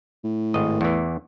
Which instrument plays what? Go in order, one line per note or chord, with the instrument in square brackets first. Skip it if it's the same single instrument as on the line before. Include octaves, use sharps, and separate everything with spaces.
[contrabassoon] A2
[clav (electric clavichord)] G#1 D#5
E2 E3